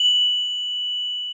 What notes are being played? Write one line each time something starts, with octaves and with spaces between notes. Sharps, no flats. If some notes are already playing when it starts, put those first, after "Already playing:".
Already playing: F#7